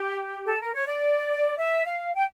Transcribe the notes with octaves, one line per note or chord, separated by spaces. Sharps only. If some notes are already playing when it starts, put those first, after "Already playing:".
Already playing: G4
A4
A#4
C#5
D5
E5
F5
G5